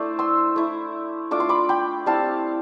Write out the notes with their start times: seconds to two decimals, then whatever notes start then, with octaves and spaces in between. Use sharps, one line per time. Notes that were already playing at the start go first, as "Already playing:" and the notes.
Already playing: A3 D4 E4 C5 D5
0.19 C6 E6
0.56 A3 E4
1.31 A3 D4 F4 D6
1.40 C6
1.49 B5 D6
1.69 G5 B5
2.06 G3 C4 E4 F5 A5